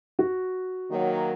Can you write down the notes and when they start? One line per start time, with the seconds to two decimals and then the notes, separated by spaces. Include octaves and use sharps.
0.19 F#4
0.91 D#3 F#3 A#3